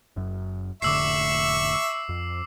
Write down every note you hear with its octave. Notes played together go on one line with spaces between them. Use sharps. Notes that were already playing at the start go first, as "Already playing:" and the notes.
F#1 F#2
F1 A2 D3 E5 C#6 D6 E6 C7
F2